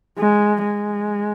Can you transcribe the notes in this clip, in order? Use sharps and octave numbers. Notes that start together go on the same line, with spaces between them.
G#3
G#3